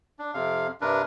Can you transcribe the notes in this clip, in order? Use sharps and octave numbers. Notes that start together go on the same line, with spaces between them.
D4
F2 C3 F5
G2 C3 D4 A#4 B4